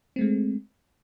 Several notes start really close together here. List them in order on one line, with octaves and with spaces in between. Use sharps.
C4 A3 G#3